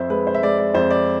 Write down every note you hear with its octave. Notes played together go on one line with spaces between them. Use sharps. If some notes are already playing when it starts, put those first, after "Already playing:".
Already playing: F2 C5 E5
G#3 B4
C5
E5
G#3 D5
D5
F2 C5
D5